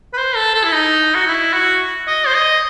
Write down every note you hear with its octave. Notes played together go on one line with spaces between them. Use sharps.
B4
C5
A4
A4
E4
D#4
F#4
E4
F#4
D#5
C5
D#5